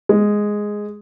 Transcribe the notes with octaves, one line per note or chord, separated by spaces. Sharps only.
G#3